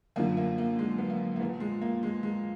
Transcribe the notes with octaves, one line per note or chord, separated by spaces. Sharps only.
F#2 D3 F3 A#3
A#3
A#3
G#3
B3
A#3
A#3
A#2 F3 B3
G#3
A#3
G#3
G#3